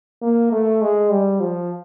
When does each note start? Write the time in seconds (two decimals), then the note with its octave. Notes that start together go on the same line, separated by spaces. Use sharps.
0.22 A#3
0.52 A3
0.81 G#3
1.10 G3
1.40 F3